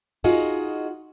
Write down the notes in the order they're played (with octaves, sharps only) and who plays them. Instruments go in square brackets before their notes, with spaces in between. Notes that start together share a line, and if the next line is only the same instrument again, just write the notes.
[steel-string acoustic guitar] D#4 F4 F#4 G#4 D#5